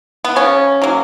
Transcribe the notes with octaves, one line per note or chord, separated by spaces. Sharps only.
B3
C#3 C#4
F#3 A#3